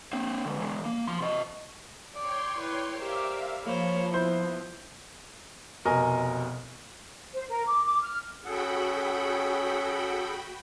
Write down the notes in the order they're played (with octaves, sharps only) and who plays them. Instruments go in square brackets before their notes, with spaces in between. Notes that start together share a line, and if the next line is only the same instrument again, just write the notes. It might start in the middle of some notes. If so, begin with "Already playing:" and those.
[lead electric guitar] A#3 C4
D3 G#3
E3 G#3
A#3
F3 C6
C3 D#5
[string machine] C#5 G5 C6 [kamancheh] D5
[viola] E4 B4
[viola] G4 C5 [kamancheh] A#4 D5 [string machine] E5 F5
[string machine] F3 [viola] A#3 C5 [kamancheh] C#5 B5
[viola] B3 [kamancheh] E4 [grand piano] C5
[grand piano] F1 B2 A#4 D#5 G#5
[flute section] C5
A#4
D6
D6
F6
[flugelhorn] C#4 [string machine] F#4 G5 B5 [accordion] G#4 A4 F#5